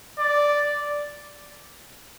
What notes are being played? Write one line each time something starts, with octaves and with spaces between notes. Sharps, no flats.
D5